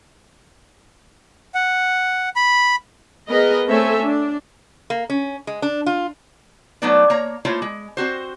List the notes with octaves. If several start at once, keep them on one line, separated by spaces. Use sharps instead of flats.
F#5
B5
B3 G#4 A#4 B4 D#5
A3 C4 A4 C#5 E5 G#5
D4
A#3
C#4
G#3
D4
F4
F#3 A3 B3 D#4 B4 D5
A#3 C#5 A#5
A3 A#3 E4 F4 C5 C#5
G#3
C4 F#4 C5